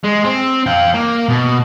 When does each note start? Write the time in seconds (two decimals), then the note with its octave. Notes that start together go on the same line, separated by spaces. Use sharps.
0.04 G#3
0.24 C4
0.66 F5 G5
0.94 A#3
1.29 B2